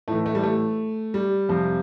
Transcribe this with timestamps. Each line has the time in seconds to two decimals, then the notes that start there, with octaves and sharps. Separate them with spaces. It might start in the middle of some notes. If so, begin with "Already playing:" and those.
0.08 A2 E3 A3
0.26 A3
0.35 G3
0.43 A3
1.14 G3
1.49 F2 C3 F3